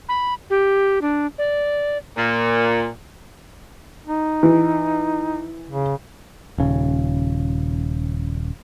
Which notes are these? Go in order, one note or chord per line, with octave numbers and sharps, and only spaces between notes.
B5
G4
D4
D5
A#2
D#4
E3
C#3
D#1 C#3